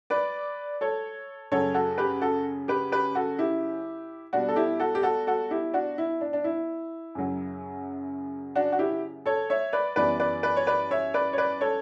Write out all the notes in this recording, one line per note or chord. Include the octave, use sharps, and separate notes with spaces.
B4 D5
A4 C#5
F#2 C#3 F#3 A4 C#5
F#4 A4
G4 B4
F#4 A4
G4 B4
G4 B4
F#4 A4
E4 G4
B2 G3 B3 D4 F#4
A4
E4 G4
F#4 A4
G4
F#4 A4
F#4 A4
E4 G4
D4 F#4
E4
D4
D4
E4
F#2 C#3 F#3
D4 F#4
F#4
E4 G4
A4 C#5
C#5 E5
B4 D5
F#2 E3 G3 B3 B4 D5
B4 D5
B4 D5
C#5
B4 D5
C#5 E5
B4 D5
C#5
B4 D5
A4 C#5